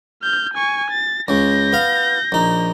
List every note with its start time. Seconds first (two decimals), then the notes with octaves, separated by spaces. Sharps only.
0.22 F6 G6
0.54 G#5 C#6
0.90 A6
1.28 C#2 C#3 G6 A#6
1.72 B3 F5
2.32 A#1 D#4